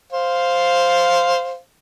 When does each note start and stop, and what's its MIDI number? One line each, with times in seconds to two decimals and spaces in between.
0.12 1.58 72
0.12 1.58 77